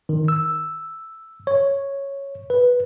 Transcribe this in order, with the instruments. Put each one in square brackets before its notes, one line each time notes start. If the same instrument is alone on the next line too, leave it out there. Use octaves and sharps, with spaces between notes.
[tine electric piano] D#3
E6
C#5
B4